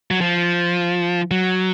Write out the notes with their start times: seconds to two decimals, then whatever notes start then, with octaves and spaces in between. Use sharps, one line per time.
0.11 F#3
0.21 F3
1.31 F#3